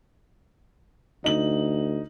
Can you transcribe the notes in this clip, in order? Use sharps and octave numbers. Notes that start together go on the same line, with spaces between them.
D2 D#4 F#7